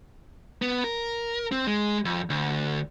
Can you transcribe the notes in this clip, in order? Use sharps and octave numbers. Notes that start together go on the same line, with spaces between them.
B3
A#4
C4
G#3
F2
D2